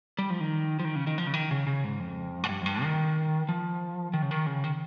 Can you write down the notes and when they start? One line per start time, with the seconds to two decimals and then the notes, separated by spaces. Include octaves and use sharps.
0.19 G3
0.30 F3
0.40 D#3
0.79 F3
0.85 D#3
0.96 C#3
1.07 D#3
1.18 F3
1.27 C#3
1.34 D#3
1.51 C#3
1.67 C#3
1.84 G#2
2.00 F2
2.43 G#2
2.49 G2
2.62 F2
2.66 G2
2.83 D#3
3.49 F3
4.14 D#3
4.22 C#3
4.31 D#3
4.46 C#3
4.64 D#3